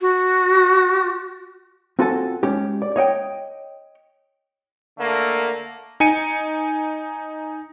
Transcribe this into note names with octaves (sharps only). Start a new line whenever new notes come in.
F#4
C4 F4 F#4 A4 G#5 A5
G#3 C#4 G4
D5
C#5 D#5 F#5 G5
D3 A3 A#3
D#4 G#5 C#7 D#7